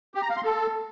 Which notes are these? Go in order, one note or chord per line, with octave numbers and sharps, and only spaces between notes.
G4
A#5
F5
C6
A4